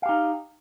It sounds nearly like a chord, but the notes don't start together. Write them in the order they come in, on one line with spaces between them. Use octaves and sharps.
F5 G4 D#4